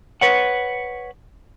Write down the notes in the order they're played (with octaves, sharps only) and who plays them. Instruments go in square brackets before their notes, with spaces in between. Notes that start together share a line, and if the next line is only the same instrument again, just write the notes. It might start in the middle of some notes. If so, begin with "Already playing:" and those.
[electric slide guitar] B4 C#5 F#5